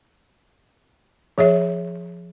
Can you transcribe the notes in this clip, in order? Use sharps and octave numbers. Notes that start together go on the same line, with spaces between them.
F3 G#4 C#5 E5